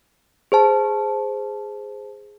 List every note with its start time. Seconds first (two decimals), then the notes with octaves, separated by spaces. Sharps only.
0.52 G#4 C5 A5